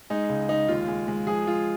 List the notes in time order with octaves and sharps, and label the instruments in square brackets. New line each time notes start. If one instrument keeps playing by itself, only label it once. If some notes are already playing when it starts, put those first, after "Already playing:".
[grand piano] G#3 D#4
C#2
G#3 D#4
D#2 F4
G#3
G#3
F3 G#4
F3 F4